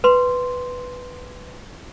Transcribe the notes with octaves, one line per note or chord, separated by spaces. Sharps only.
B4 C6